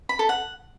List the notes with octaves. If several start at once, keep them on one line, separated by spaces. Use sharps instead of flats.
B5
A4
F#5